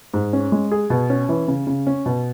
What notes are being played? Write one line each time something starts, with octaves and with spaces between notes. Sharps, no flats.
G#2
C#4
G#3
G#4
B2
C#4
E3
C#3
C#3
C#4
B2